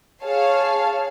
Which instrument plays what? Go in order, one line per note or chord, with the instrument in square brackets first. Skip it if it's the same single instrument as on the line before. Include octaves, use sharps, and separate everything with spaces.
[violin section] G#4 C#5 F5 A5